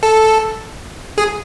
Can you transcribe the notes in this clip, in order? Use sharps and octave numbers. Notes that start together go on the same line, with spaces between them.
A4
G#4